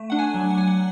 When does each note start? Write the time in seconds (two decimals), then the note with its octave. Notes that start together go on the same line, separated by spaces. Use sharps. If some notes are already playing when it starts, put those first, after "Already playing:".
Already playing: A3
0.10 D4 F#5
0.19 G#5
0.34 F#3
0.50 F#5
0.57 F#3 G#5
0.67 F#5